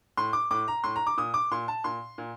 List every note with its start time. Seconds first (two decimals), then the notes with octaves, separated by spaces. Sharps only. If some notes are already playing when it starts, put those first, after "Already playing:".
0.17 A2 C6
0.33 D6
0.51 A2 D6
0.68 A#5
0.84 A2 C6
0.96 A#5
1.07 D6
1.17 A#2 D#6
1.34 D6
1.51 A#2 C6
1.68 A5
1.84 A#2 C6
2.18 A#2